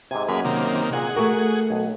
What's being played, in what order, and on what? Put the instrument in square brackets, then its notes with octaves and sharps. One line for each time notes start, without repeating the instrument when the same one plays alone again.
[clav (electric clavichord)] G#2 C3 [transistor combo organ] G#5
[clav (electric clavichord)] F#2 [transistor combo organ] A#3 G#4 B4
[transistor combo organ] C3 D#3 A#3
[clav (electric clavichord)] A#2 [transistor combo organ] G#4 F#5
[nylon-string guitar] A3 A#4 [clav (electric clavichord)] F#4
[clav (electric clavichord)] B1